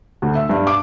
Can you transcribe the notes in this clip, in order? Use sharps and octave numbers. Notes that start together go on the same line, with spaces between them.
D2
E5
G2
D6